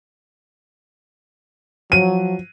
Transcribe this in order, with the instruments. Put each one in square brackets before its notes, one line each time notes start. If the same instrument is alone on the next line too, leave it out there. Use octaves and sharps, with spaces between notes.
[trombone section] F3 F#3 [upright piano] D#7